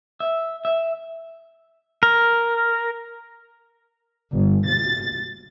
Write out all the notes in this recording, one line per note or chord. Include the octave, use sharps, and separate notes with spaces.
E5
E5
A#4
G1
A6